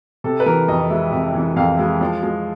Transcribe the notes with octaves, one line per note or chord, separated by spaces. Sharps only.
C3 A4
B4
E3 A#4
F2 D#5
G#3 E5
C3 E5
E3
F2 F5
G#3
F3
G#3